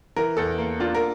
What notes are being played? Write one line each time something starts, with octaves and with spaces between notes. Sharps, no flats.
E3 A#4
E2 A4
A#3
D4 F4
A#4